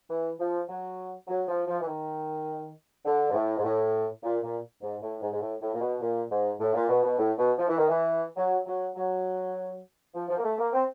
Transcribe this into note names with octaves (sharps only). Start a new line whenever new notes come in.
E3
F3
F#3
F#3
F3
F3
E3
D#3
D3
G#2
A2
G#2
A2
A#2
A#2
G#2
A2
G#2
G#2
A2
A2
A#2
B2
A#2
G#2
A2
A#2
B2
B2
A2
B2
F3
E3
D#3
E3
F#3
F#3
F#3
F3
F3
A#3
A3
A#3
C4